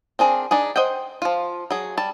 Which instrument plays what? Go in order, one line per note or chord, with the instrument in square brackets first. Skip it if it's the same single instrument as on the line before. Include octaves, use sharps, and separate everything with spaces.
[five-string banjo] C4 D4 G#4 A#4
D4 D#4 G#4
C5 D#5 F#5 G5
F3 F4
F#3 G#4
G3 A5